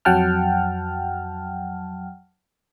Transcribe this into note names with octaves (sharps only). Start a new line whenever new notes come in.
F2 F#3 F#5 G5 A5 F6